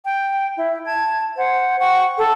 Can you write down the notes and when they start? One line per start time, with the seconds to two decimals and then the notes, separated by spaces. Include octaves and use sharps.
0.04 G5
0.56 E4
0.85 A5 G#6
1.37 C5 F#5
1.79 F#5 G5 C#6
2.16 A4